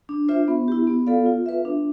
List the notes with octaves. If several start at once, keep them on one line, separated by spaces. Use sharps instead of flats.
D4
F4 C5 E5
B3
E4 G4
B3
F4 A4 D5 F5
F4
B4 E5
D4